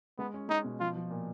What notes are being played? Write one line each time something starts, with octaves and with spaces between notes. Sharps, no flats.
G#3 B3
C#4
G#3 D#4
B2
F3 F4
F3
A#2